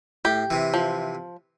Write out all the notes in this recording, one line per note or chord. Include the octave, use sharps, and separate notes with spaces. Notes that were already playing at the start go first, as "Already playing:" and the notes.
A2 G4
C3 E3
F3